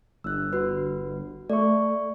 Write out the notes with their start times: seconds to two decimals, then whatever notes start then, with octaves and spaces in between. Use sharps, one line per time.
0.24 G1 E6 F#6
0.53 F#4 B4
1.50 A3 D5 C#6